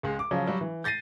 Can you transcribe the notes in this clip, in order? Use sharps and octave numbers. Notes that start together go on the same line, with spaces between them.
C#2 G#3
D6
C#3 F3 F#3
F#3 G3
E3
G6 A6 A#6 C7 D#7